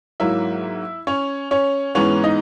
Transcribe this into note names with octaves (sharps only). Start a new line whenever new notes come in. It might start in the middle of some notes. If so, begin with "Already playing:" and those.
G#2 F#3 A#3 E4 E5
C#4 C#5
C#4 C#5
G#2 E3 G#3 B3 C#4 C#5
D#4 D#5